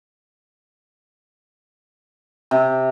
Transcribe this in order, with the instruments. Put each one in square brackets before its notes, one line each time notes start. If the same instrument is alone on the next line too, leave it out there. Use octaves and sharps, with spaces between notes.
[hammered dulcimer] C3